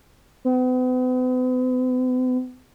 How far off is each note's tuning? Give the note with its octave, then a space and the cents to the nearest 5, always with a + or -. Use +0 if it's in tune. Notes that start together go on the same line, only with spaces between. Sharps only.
B3 +45